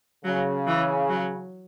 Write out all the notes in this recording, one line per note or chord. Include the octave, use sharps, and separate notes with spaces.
C#3 F#3
E3
F#3